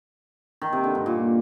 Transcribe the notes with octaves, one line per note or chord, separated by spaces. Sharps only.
D#3
C3
D3
G2
A#2